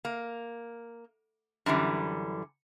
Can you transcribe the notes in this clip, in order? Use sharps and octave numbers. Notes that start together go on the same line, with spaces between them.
A#3
F#2 D3 E3 G3